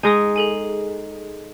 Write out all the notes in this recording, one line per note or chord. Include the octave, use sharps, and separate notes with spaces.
G#3 D#4 G#5 D#6
G#4 A4 G#5